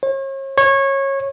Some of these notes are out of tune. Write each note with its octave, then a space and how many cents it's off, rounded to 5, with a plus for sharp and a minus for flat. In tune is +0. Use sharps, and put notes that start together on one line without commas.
C#5 -40
C#5 -20